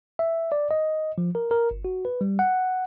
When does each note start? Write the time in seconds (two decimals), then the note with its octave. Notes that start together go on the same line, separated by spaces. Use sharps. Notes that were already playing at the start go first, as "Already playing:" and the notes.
0.19 E5
0.52 D5
0.71 D#5
1.18 F3
1.35 A#4
1.51 A#4
1.71 G1
1.85 F#4
2.05 B4
2.21 G3
2.39 F#5